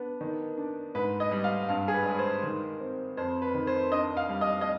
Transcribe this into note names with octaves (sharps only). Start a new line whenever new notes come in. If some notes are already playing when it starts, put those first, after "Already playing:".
Already playing: B3 D4
D#3
D4
G#2 B4
D#5
G3
F5
G2 F5
G#4
B4
G#3
C5
D#3
C4
F2 C5
B4
D#3
C5
D4 D#5
F5
G3
D#5
D#5